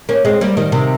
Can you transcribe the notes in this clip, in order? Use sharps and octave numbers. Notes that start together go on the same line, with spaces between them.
A#3 C#4
G#3 C4
G3 A#3
D#3 G3
C3 D#3